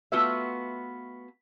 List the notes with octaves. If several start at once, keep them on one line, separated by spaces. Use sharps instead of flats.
A3 B3 F4 F#4 B4 E5